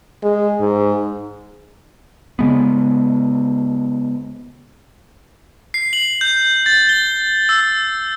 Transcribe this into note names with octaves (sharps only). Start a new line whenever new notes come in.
G#3
G#2
C#3 G#3 B3
C7
F#7
G6
A6
G7
E6